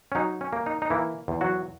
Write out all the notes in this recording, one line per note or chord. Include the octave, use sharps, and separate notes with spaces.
C#4
F#3 D#4
C#4
A#3
D#4
D#4
E3 A#3 E4
E2
F#3 F#4